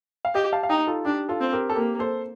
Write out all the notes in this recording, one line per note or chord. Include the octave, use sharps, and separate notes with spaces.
F5
G4 D#5 G5
F5 A5
F5
D#4 D#5 G5
F4 A4
D4 G4
F4 A4
C4
G4 A#4
A4
A#3 G4 A#4
A4 C5